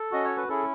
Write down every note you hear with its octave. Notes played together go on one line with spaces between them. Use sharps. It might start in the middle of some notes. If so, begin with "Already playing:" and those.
Already playing: A4
C#4 F#4 D#5
C#5
B4
C#4 E4 G#4 A4